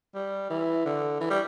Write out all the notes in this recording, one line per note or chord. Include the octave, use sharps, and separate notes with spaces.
G3
E3
D3
E3
G3